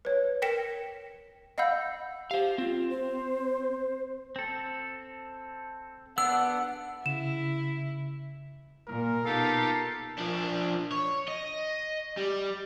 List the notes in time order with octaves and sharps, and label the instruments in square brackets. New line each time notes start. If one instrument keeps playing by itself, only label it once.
[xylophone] B4 C#5
A#4 G5 A#6 B6 C#7 E7
D#5 F5 F#5 B5 E6 G6
[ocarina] G4 [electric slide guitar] C5 F5
[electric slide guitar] C4 [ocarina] F4
[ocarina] C5
[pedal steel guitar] C4 A4
[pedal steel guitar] B3 D4 [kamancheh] F#5 [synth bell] E6
[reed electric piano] C#3 [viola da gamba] E4 [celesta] E7
[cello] A#2 [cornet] A#4
[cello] B2 F4 [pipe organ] D#4 G4 F5 [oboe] A4
[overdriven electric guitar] F3 D4
C#5
D#5
G3